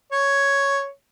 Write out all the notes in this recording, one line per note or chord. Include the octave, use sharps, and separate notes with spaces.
C#5